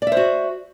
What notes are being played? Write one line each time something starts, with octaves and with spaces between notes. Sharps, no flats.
F#4 C5 D5 E5